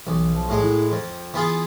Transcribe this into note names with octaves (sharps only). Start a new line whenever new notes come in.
B1 E3
F3
A2 G#3
E4
F2
E3 B3 F4 G#4